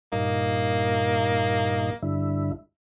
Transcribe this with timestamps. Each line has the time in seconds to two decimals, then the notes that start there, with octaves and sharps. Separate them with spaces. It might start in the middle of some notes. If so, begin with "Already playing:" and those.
0.12 G2 A#2 A#3 D#4
2.03 G2 D3 E4